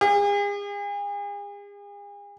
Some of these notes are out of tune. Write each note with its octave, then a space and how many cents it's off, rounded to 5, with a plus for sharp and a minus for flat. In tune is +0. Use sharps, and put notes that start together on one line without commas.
G#4 -40